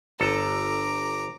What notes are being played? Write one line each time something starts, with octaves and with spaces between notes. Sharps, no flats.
G1 A4 A#5 D6